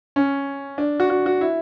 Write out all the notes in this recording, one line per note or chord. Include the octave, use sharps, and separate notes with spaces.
C#4
D4
F#4
F#4
F#4
E4